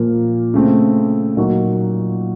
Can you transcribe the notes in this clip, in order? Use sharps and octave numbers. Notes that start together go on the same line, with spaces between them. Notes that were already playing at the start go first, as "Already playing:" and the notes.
Already playing: A#2 F3 A#3
C#3 A3 C4
A#2 F#3 A#3 D#4 F#4